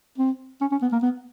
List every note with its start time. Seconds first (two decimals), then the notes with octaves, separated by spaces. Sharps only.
0.18 C4
0.61 C#4
0.72 C#4
0.82 B3
0.92 A#3
1.03 B3